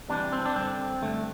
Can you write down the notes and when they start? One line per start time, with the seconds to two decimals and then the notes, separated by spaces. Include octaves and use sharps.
0.09 C2 C3 E3 D4
0.32 C4
0.45 D4
0.56 G2 D3 C4
1.02 G2 D3 A3